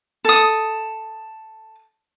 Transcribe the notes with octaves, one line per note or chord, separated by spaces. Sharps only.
A4 D#6